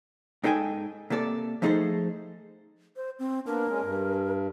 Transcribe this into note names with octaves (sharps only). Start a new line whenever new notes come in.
G#2 D#4 A4 G5 G#5
C3 A#3 A4 D5
F3 A3 D#4 G#4 A4 C5
C5
C4
A#3 B3 D4 A#4
G#3 C#4
G2